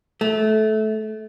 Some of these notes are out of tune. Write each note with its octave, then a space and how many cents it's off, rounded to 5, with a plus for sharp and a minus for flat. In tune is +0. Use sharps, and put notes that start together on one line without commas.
A3 -20